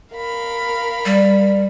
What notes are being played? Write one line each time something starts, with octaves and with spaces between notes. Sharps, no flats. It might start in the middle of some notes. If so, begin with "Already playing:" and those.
A#4 F5 B5
G3